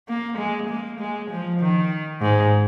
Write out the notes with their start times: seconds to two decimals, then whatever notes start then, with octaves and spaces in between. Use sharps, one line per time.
0.08 A#3
0.38 G#3
0.69 A#3
1.00 G#3
1.31 F3
1.60 D#3
2.22 G#2